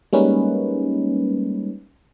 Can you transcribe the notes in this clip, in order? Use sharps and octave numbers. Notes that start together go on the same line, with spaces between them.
G3 G#3 A#3 C#4 D#4 B4